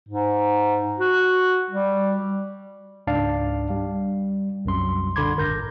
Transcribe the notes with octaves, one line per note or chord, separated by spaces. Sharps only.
G#2
F#4
G3
C#2 G#2 D4 D5 F5
G3
C2 F#2 C6
A#2 D3 B5 C6 D6 G#6
G#1 A#4 G6 A#6